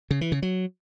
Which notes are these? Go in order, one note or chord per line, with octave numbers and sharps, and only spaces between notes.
C#3
E3
C#3
F#3